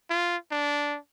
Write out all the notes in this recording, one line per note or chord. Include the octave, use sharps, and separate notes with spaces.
F4
D4